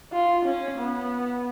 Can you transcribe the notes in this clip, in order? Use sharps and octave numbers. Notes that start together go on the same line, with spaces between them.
F4
C#4
B3